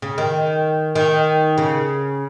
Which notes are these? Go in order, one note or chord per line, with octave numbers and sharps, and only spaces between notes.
C#3
D#3
D#3
C#3